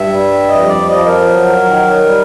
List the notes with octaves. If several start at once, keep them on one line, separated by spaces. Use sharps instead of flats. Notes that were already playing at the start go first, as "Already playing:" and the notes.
Already playing: G2 E5
G3
F2 D#5
D5
F3 D#5
A#4
F#3
D#3
G3